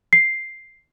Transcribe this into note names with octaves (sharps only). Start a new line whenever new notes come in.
C7